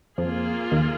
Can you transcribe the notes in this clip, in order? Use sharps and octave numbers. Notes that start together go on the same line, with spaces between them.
F2 F3 A#3 F4 G#4
D#2 D#3